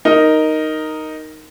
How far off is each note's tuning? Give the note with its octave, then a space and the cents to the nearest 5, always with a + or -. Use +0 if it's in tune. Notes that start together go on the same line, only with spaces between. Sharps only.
D#4 +0 A#4 +0